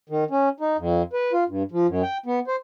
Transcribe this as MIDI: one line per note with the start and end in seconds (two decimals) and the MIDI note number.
0.09 0.24 51
0.31 0.49 61
0.60 0.77 63
0.78 1.02 41
1.13 1.32 71
1.32 1.44 65
1.48 1.63 43
1.72 1.87 53
1.88 2.02 42
2.03 2.18 79
2.26 2.39 59
2.48 2.56 72